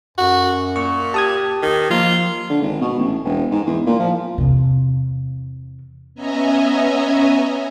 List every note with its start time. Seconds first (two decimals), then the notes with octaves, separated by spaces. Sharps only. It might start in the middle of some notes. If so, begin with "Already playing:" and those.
0.18 F#2 F#4
0.76 A#2 C#6
1.14 G4 A5 D#6 G#6
1.62 D#3 G4
1.90 F3 A#3 F4
2.50 D3
2.61 G#1
2.82 B2
2.99 A1
3.25 E1
3.51 G#2
3.66 E2
3.86 A#2
4.00 F3
4.38 E2 C3
6.15 B3 C#4 D#5 E5 G#5 A#5